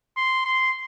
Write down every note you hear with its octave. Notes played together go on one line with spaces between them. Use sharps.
C6
C6